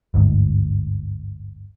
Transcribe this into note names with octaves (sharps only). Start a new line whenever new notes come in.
G1 D2 G#2